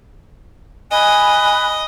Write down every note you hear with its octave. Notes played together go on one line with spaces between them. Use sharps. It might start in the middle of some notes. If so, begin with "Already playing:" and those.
D#5 G#5 B5 F#6